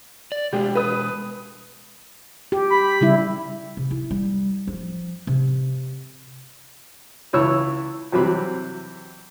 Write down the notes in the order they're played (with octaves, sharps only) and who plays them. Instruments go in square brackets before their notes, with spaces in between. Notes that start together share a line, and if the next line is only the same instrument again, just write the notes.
[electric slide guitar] D5
[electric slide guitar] B2 G#3 [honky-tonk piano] G4
[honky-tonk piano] B4 D#6
[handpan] G4
[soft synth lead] B5
[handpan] C#3 G3 E4
[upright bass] C3
E4
G3
F3
C3
[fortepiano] C#2 E3 E4 C#5 E6
E2 C3 E3 F#3 C4 B5